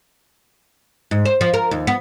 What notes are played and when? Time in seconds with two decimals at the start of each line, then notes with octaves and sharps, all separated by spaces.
1.11 G#2
1.25 C5
1.41 F3
1.54 A#4
1.71 D#2
1.87 B3